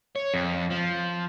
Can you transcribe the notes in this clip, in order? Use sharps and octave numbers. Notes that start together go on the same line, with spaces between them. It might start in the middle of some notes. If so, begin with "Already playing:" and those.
C#5
F2
F3